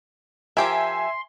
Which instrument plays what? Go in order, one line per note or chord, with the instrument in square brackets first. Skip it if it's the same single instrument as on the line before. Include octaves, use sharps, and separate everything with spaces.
[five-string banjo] F3 G4 A#4 [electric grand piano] E5 G#5 [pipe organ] C6